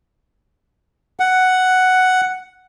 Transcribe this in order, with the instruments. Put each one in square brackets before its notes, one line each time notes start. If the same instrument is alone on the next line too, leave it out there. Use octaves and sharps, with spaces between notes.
[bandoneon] F#5